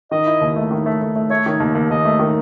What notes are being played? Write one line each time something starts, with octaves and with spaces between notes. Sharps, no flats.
D#3 D#5
E4
D#2
A3
D#3
A3
A3
A3
A3 C#5
D#3
D#2
D#2
D#2 D#5
A3
D#3